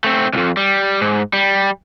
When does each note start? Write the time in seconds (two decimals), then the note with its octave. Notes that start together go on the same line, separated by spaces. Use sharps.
0.04 A3 C4
0.33 C2 F2
0.57 G3
1.01 G#2
1.33 G3